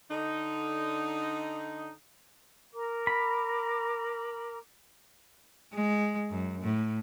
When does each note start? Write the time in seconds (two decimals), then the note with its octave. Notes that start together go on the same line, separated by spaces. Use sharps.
0.10 D3 D#4
2.73 A#4 A#5 D6
3.07 B5
5.74 G#3
6.30 F#2
6.62 A2